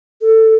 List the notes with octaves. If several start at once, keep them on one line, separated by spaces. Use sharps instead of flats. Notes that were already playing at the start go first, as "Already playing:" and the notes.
A4